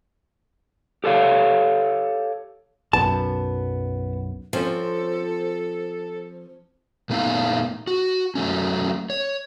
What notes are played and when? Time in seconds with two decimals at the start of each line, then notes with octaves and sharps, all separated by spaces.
1.04 G4 A4 C#5 F5
2.93 B1 F#2 B3 A5
4.53 F3 C4 C#4 A4
7.10 A#2 A3 B3 D#4 F5
7.87 F#4
8.35 F#3 A3 C#4
9.10 C#5